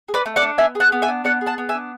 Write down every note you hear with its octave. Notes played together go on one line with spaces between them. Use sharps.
G#4
B4 D5
A3
D5 F#5
D4
B3 E5 G#5
G#4
F#5 A5
B3
E5 G#5
D4
B3 D5 F#5
G#4
F#5 A5
B3
E5 G#5
D4